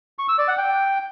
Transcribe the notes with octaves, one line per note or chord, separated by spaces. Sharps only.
C#6
E6
D5
F#5
G5